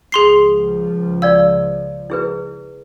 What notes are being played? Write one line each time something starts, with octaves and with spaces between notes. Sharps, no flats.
C#2 F3 G#4 C6 C7
D5 F5 E6
E4 G#4 B4